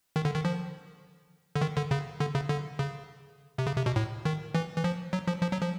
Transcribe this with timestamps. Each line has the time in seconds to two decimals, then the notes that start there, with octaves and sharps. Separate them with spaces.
0.16 D#3
0.25 D3
0.35 D#3
0.45 F3
1.55 D3
1.61 D#3
1.77 D3
1.91 C#3
2.20 D3
2.35 C#3
2.49 D3
2.79 C#3
3.58 C3
3.67 C#3
3.77 C3
3.86 B2
3.96 A2
4.25 D#3
4.55 E3
4.76 E3
4.84 F3
5.13 F#3
5.27 F3
5.42 F3
5.52 F#3
5.62 F3